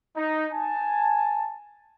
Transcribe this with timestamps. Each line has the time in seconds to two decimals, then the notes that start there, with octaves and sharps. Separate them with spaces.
0.16 D#4
0.52 G#5 A5